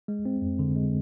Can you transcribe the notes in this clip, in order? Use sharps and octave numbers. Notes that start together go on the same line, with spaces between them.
G#3
C4
F2
D3
G#3